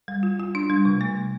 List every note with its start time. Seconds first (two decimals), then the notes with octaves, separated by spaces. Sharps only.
0.08 G3
0.23 F4
0.40 F4
0.55 D4
0.70 G3
0.85 C3
1.01 A3